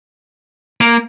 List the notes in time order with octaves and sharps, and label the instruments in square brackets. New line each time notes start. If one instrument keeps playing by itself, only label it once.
[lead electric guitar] A#3